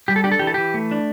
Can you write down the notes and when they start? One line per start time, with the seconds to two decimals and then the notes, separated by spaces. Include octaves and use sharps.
0.08 G3 G4
0.16 A4
0.24 D4 G4
0.32 A4
0.39 E3 G4
0.47 A4
0.54 E3 G4
0.74 A3
0.91 D4